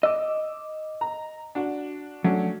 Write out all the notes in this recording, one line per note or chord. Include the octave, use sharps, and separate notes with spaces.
D#5 D6 E6
A#5
D4 F#4
F#3 A3 C#4 D4